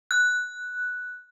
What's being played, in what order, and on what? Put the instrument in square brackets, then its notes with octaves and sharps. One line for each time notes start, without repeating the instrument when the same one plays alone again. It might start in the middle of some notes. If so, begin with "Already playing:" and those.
[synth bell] F#6